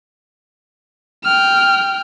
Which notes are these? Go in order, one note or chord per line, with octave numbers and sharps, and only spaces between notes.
G5 F6